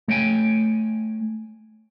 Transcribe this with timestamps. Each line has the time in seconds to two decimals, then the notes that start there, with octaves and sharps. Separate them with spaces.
0.08 A3 C#5 G5 G#5